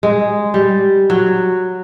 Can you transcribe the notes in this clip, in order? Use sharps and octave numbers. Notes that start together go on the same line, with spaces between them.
G#3
G3
F#3